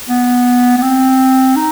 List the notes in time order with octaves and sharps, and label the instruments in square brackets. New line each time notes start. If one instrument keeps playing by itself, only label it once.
[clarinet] B3
B3
C4
D#4